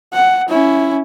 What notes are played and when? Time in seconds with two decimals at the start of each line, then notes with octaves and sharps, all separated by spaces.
0.13 F#5
0.49 C#4 E4